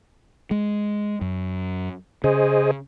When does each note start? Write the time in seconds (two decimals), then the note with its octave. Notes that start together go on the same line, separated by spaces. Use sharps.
0.51 G#3
1.21 F#2
2.24 C#3 G#4 C5 D#5